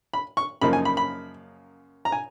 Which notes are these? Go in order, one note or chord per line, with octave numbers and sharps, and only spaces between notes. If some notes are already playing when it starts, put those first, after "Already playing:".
B5
C#6
F#2 C#3 F3 A#3 D#4 B5
G#5
B5
B5
A#5
G#5